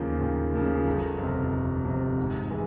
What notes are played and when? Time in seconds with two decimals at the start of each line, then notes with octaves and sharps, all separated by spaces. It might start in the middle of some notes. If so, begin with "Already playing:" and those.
Already playing: D#2 C#3 F3 A#3
0.21 D#2
0.54 C#3 F3 A#3
0.87 G1
1.19 F2 C3
1.52 G1
1.85 F2 C3
2.18 G#2
2.50 E3 G#3